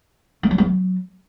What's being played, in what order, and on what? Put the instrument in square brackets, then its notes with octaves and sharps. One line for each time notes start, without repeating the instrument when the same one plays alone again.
[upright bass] A3
F#3
G#3
F#3